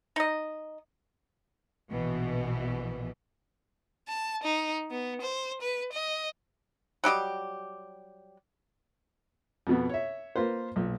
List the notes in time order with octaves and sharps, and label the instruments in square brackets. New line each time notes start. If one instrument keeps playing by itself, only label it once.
[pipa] D#4 D#5
[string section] A#1 B2 E3
[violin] A5
D#4
B3
C5
B4
D#5
[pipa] F#3 G3 G4 D#5
[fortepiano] F2 B2 B3
C#5 E5
A#3 F4 B4 C5
B1 A#2